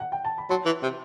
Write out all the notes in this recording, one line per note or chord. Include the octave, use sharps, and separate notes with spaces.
F#5
G5
A5
B5
F#3 A5 C6
E3
C3